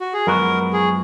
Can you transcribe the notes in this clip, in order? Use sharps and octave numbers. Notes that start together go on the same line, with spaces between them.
F#4
G#4
F#2 F3 G#3 B3 F#4 A#4
G#4